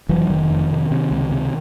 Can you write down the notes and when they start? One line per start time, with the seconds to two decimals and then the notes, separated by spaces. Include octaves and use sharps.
0.09 F1 E3 F#3
0.30 F1 D#3
0.50 F2
0.71 C3
0.91 C3
1.11 C#2
1.32 C3